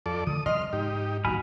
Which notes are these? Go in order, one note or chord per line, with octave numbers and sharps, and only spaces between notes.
F2 A4 D5
D3 E3 A3 D#6
C3 F3 G3 D#5 C6 F6
G#2 D#4 G4
D1 G#1 F#3 A#3 G#5 B5 F6